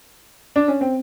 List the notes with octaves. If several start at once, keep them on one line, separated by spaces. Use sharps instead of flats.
D4
C#4
C4